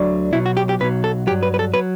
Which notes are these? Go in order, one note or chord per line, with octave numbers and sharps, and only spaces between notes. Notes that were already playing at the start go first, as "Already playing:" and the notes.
Already playing: D2 D3 F#3
B1 B2 F#3 E4
F#4
G4
G4
B1 B2 F#3 B4
A4
G2 F#3 G4
B4
B4
A4
F#3 B4